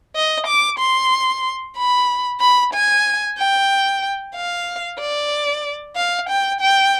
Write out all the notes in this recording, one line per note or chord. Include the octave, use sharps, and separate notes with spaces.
D#5
D6
C6
B5
B5
G#5
G5
F5
D5
F5
G5
G5